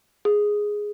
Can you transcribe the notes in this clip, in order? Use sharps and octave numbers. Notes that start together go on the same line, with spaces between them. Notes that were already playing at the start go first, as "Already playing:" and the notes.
G#4